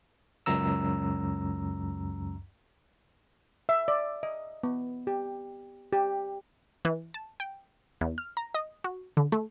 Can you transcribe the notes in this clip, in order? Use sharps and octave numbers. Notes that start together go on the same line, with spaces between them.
C#2 F#2 A#5 E6
E5
D5
D#5
B3
G4
G4
E3
A5
G5
E2
F6
A#5
D#5
F#4
D3
A3